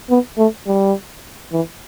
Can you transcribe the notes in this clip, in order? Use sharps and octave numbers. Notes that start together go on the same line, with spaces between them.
B3
A3
G3
E3